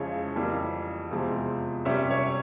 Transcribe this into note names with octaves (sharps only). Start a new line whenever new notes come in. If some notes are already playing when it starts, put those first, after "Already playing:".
Already playing: F2 C#3 F3 G#3 E4 C#5
F2 E3 G3 A#3
E2 C3 F3 G#3 C4
C3 G3 C#4 E5
C#5